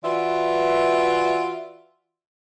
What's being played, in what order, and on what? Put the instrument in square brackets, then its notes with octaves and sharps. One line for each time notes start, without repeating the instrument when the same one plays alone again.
[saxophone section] E3 F4 F#4 B4 D5 E5